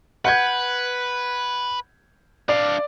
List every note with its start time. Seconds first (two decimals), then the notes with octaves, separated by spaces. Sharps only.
0.25 B4 F#5 G6 G#6
2.49 D4 D5 F5